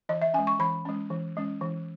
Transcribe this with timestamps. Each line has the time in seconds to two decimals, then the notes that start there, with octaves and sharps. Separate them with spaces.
0.09 E3 D#5
0.22 E5
0.34 G#3 C#4 G#5
0.47 C#6
0.59 E3 B5
0.85 G#3 C#4
1.10 E3
1.37 G#3 C#4
1.61 E3